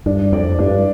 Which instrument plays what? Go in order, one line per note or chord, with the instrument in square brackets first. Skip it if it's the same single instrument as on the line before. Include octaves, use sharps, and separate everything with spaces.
[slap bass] G2 [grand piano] D4
[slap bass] F2 [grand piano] D5
[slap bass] G2 [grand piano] D4